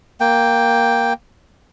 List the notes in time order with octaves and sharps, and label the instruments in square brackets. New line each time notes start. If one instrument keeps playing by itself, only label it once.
[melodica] A#3 G5